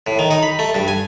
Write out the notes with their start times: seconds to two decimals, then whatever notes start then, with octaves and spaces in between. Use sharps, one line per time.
0.07 A2
0.19 D#3
0.31 D#4
0.43 B5
0.59 A3
0.74 G2
0.88 G#5